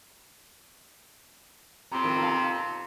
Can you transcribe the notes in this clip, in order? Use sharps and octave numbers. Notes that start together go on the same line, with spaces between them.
F2 C3 G5 A#5 B5
D#3 F4 E6
F5 A5 A#5